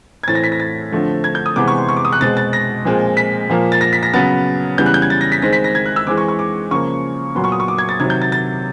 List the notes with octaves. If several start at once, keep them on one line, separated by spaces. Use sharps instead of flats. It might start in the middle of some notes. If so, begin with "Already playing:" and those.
G#6
A2 E3 A3 C4 A6
A#6
B6
A#6
A6
D3 F3 A3 C4
G#6
G6
D#6
C3 E3 G#3 B3 D6
C#6
C6
C#6
D6
D#6
F#6
B2 G#3 C4 A6
A6
A#6
A#2 F3 G#3 C4
B6
A#2 F3 A#3
A6
A#6
B6
A#6
C#3 F#3 B3 A6
C#3 E3 G3 B3 G6
F#6
G6
G#6
A6
A#6
B6
D#3 G#3 C4 A#6
B6
A#6
G#6
F#6
E6
E3 G#3 C4 D6
C#6
C#6
D6
C#3 F3 A#3 C#6
A#2 F#3 B3 C6
C#6
D#6
C#6
D6
G#6
A6
C3 D#3 F#3 G#6
G6
A6
A6